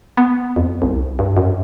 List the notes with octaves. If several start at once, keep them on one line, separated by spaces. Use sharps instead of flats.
B3
F2
C2
G2
F#2